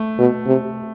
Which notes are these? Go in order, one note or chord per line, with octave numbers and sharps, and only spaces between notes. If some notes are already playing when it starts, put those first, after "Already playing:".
Already playing: A3
B2
C3